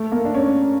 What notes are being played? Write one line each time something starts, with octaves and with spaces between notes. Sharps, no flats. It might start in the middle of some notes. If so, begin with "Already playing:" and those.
Already playing: A3
A#3
D4
C#4